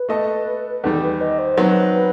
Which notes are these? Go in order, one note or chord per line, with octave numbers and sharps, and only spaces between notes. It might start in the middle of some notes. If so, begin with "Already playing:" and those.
Already playing: B4
A3 E4 A4 D#5
E2 D#3 G3 A4
B4
D#5
C5
F#3 C4 D#4 B4
B4